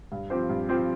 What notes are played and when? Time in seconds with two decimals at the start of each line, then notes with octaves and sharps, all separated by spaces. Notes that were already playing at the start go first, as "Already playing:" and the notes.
0.12 G2
0.30 F3 C4 G4 C5
0.49 G2
0.69 F3 C4 G4 C5